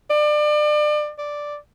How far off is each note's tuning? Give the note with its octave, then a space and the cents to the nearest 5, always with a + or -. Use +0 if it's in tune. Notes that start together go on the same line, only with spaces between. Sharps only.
D5 +30
D5 +0